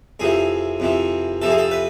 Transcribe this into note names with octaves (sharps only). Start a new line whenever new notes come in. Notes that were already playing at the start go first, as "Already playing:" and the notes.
F2 C3 E3 G#4
F2 C3 E3
F2 C3 E3 A4
G#4
A4
B4